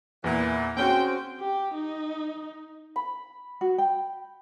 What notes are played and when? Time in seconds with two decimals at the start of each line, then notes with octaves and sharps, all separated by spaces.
0.24 E2 A#2 E3
0.77 C4 C#4 F#4 G#4 C5 G5
1.40 G4
1.75 D#4
2.96 B5
3.61 F#4
3.78 G5